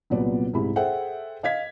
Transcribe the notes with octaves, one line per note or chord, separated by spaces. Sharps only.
C2 A#2 F#3 B3 D5
C2 G#2 E4 B5
G#4 A4 C5 E5 F#5 G5
D#5 F5 G#6 B6